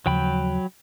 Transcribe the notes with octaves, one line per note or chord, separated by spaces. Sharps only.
D#2 C#3 F3 F#3 G5 B5